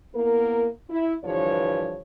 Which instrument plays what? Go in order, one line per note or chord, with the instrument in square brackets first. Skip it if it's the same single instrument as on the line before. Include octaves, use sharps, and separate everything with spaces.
[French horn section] A#3 B3 E4 A#4
E4
G2 D3 E3 F3 G3 C#5